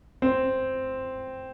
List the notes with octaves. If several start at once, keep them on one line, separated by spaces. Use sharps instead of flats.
C4